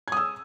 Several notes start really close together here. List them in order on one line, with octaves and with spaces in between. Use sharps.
G#6 D#6 E6